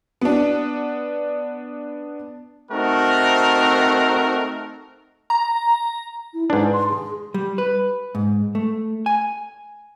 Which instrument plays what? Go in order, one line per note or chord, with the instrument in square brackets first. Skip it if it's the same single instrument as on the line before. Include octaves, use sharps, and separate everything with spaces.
[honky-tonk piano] B3 D4
[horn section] A3 C4 D#4 F#4 A#4
[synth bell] A#5
[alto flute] E4
[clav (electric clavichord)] G#2 D4 [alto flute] B4
[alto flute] C6
G#4
[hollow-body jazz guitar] G3
B4
G#2
A3
G#5